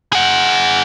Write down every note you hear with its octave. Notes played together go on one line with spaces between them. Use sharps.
G#4 F#5